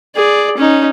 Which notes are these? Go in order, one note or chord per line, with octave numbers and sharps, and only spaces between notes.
G#4 D5
C#4 D#4